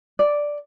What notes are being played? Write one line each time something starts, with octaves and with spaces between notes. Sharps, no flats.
D5